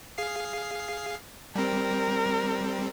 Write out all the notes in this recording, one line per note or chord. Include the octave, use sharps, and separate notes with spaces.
G#4 F5 C7
G3 C4 A#4